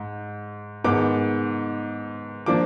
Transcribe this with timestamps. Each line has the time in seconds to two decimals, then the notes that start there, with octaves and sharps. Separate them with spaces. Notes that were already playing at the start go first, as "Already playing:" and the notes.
Already playing: G#2
0.84 G#2 D#3 G#3 B3 D6
2.46 F3 A#3 D4 D6